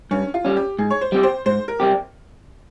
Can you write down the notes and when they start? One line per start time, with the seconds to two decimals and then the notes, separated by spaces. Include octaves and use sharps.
0.11 G2 C#4
0.34 F4
0.45 G3 C#4
0.57 G4
0.78 G#2 G#4
0.91 C#5
1.01 C5
1.12 G3 C4 G4
1.23 C5
1.46 G#2 C5
1.68 A#4
1.80 G3 C4 G4